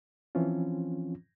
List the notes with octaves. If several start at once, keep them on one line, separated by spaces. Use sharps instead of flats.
E3 F3 C4 C#4 F4